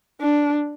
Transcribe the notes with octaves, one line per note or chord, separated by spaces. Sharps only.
D4